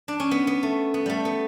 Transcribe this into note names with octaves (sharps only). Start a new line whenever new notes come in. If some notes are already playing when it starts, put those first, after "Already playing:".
D4
C#4
B3
B3
A3
B3
G3 A3
B3